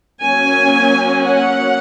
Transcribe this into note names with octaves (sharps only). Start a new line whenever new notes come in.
F#3 A#3 C#4 G#5
F#5